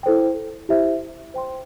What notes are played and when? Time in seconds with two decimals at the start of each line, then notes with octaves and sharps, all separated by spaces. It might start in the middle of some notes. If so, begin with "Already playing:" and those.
0.03 E4 A4 C5 G5
0.69 E4 G4 C5 E5
1.34 C5 G5 C6